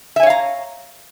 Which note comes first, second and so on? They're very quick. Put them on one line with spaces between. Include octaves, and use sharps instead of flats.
E5 G#5 C#5 F5 A#5